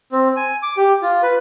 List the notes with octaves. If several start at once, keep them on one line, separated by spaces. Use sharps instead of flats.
C4
G#5
D6
G4
F4
B4